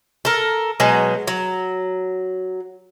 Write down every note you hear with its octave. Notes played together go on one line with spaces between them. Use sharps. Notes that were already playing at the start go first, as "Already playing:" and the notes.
A4 A#4
B2 F#3 G#3
F#3